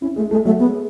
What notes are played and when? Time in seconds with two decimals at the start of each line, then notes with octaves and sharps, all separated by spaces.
0.01 C#4 E4
0.16 G#3 A3
0.31 G#3 A3
0.45 F#3 A3
0.59 G#3 B3